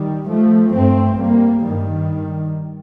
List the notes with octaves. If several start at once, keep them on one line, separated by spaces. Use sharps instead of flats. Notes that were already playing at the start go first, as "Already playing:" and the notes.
Already playing: D#3 G3
F3 A3
G2 A3 C4
G3 A#3
G2 D#3 G3